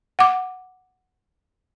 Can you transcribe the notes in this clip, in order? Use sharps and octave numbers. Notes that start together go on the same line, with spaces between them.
F#5 D6